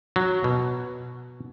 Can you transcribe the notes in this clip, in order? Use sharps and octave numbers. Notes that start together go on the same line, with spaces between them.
F#3
B2